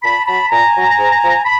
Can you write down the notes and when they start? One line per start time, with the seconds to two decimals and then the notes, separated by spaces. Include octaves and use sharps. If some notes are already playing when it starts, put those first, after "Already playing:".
0.02 A#2 A5 B5
0.26 F#3 A5 B5
0.49 A#2 G#5 A#5
0.73 F#3
0.97 G#2
1.21 F3
1.44 A5 B5